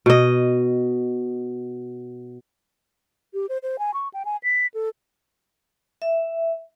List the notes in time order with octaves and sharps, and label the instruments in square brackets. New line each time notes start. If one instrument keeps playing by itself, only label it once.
[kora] B2 D#5
[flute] G4
C5
C5
G#5
C#6
G5
G#5
B6
A4
[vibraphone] E5